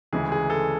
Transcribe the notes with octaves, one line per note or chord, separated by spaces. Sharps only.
D2 C#3 E3 G#3 G#4
G#4
A4